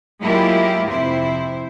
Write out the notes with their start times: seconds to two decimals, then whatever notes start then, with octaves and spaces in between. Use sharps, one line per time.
0.21 F#3 G#3 A#3 E4 F4 G4
0.88 F2 C3 E4 C5